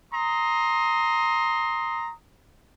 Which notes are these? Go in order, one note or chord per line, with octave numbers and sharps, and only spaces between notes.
A#5 C6 D#6